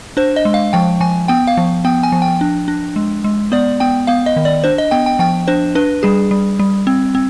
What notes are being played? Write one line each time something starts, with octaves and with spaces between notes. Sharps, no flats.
D4 C5
D#5
G#3
F5
F3 G5
F3 G#5
B3 G5
F5
F3
B3 G5
G#5
F3
G5
D4
D4
G#3
G#3
B3 D5
B3 G5
B3 F5
D#5
D#3
D5
D4 C5
D#5
B3 G5
G5
F3 G5
D4 C5
D4 B4
G3 G#4
G3
G3
C4
C4